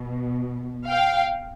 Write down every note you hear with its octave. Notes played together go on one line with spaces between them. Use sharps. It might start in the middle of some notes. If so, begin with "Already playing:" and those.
Already playing: B2
F5 G5